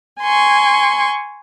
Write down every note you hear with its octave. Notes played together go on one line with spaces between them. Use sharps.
G#5 C6 C#6